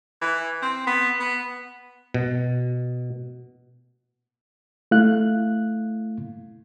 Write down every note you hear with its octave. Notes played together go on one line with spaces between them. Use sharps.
E3
C4
B3
B3
B2
A3 E4 F5 F#6